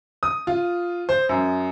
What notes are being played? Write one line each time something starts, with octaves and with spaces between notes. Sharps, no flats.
D#6
F4
C5
F#2